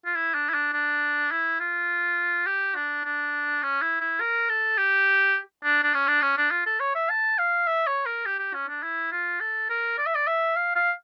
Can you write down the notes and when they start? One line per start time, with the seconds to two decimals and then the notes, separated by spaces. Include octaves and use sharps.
0.06 F4
0.15 E4
0.34 D4
0.49 E4
0.54 D4
0.73 D4
1.31 E4
1.60 F4
2.46 G4
2.75 D4
3.04 D4
3.63 C#4
3.82 E4
4.01 E4
4.20 A#4
4.50 A4
4.78 G4
5.64 D4
5.83 D4
5.94 C#4
6.08 D4
6.22 C#4
6.37 D4
6.51 F4
6.66 A4
6.80 C#5
6.95 E5
7.09 A5
7.38 F5
7.67 E5
7.87 C#5
8.06 A#4
8.26 G4
8.39 G4
8.54 C#4
8.68 D4
8.83 E4
9.12 F4
9.40 A4
9.69 A#4
9.98 D5
10.06 E5
10.15 D5
10.27 E5
10.56 F5
10.75 F5